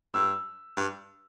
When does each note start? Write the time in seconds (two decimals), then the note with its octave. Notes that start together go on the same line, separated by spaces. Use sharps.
0.14 G2 E6
0.77 G2